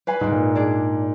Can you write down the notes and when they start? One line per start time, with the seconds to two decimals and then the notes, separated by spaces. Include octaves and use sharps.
0.07 B4 F5 G#5 B5
0.21 G#2
0.31 A#2
0.55 D4 G#4 D5